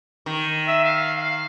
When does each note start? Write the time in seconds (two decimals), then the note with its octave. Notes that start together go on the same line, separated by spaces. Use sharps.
0.26 D#3
0.68 E5
0.84 F5
1.18 F5